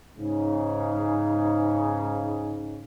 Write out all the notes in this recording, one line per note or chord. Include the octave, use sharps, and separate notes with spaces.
G#2 C#3